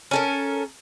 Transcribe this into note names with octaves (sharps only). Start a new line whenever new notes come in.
C#4 A4 A#4